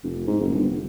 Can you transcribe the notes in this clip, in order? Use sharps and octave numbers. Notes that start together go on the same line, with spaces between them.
F1
G#2
F#1
G1
F1